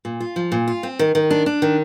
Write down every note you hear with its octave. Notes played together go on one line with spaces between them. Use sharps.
A#2
F4
F3
A#2
F4
C4
D#3
D#3
D4
D4
D#3